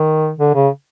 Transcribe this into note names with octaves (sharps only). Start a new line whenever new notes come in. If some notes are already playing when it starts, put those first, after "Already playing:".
Already playing: D#3
D3
C#3